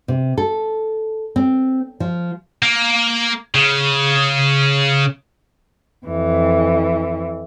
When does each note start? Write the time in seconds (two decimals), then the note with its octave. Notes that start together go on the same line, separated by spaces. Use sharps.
0.08 C3
0.38 A4
1.36 C4
2.00 F3
2.62 A#3
3.55 C#3
6.06 F2 E3